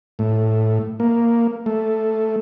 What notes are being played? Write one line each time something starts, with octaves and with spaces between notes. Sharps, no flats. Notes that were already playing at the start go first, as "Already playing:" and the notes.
A2
A#3
A3